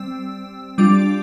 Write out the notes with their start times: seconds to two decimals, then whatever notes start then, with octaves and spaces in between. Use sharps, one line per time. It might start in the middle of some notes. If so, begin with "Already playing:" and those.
Already playing: G3 C4 E6
0.78 G3 D4 F4 D6